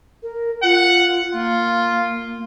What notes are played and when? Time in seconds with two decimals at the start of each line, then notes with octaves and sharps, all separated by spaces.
0.23 A#4
0.63 F4 F#5
1.33 A#3 F4